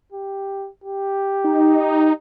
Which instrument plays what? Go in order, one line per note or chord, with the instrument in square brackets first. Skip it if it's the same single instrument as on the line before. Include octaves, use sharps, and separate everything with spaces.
[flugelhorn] G4
G4
[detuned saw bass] D#4